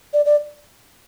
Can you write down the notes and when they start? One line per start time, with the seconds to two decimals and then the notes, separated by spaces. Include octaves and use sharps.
0.13 D5
0.26 D5